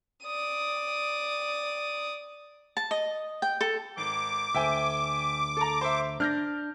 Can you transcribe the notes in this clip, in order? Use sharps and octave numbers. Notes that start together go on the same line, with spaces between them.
D5 D#6
A5
D#5
G5
A4
G#1 D6
D2 E5 G5 G#5
A4 A#5
C5 E5
D4 F6 G6 A#6